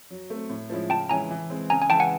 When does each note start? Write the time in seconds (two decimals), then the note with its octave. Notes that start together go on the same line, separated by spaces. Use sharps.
0.10 F#3
0.30 A3 C4
0.50 A2
0.70 F3 G#3 C#4 E4
0.90 C#3 G5 A5
1.09 E3 G#3 C#4 E4 G#5 A#5
1.30 E3
1.50 G#3 C4
1.70 C#3 G#5 A#5
1.82 G#5
1.89 E3 G5 A5
1.94 G#3
2.00 F#5 G#5